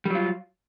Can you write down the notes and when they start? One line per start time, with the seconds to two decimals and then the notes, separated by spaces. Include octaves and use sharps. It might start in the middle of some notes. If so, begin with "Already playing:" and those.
0.05 G3
0.10 F#3
0.15 F4